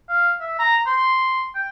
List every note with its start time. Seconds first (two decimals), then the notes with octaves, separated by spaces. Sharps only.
0.09 F5
0.40 E5
0.59 A#5
0.86 C6
1.55 G5